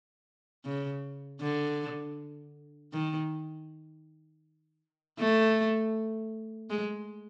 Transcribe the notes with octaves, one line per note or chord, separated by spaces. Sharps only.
C#3
D3
D#3
A3
G#3